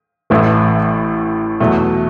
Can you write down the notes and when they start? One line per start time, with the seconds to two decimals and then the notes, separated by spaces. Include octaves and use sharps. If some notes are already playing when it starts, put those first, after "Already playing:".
0.30 A1 A2 E3 A3 E4
1.60 E2 B2 F#3 A3